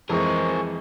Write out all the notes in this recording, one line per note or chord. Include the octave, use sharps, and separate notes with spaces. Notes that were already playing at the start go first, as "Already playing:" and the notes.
F2 E3 G#3 G#4 A#4 C5 D#5 C#6